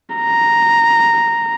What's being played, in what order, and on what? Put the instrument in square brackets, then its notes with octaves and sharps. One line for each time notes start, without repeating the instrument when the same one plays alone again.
[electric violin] A#5